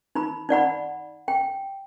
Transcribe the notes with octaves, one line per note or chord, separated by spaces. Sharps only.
D#4 B5
D#4 D5 F#5 B5
G5